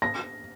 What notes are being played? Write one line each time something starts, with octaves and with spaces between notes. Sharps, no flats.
A#6